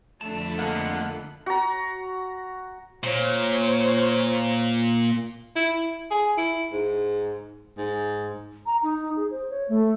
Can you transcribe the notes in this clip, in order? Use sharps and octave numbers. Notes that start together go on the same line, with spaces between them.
B1 F2 D3 A3 D4 A5 B5
G#3 A#3 F5 F#5
F#4 A#5
A#2 C5 C#5
E4
G#4
E4
G#2
G#2
A#5
D#4
G#4
C5
C#5
A3